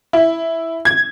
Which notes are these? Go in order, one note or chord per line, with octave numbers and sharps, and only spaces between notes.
E4
G#6